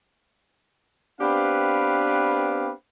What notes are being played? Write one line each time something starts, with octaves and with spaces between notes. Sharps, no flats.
B3 C4 D4 G4 B4 F5